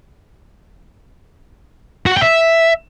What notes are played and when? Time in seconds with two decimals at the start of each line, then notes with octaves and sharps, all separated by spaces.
2.06 F#4
2.12 F#5
2.17 G5
2.22 E5